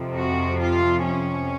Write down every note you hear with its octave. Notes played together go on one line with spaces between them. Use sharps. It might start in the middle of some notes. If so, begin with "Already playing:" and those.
Already playing: F2 C3 F3
F#4
F4
C#4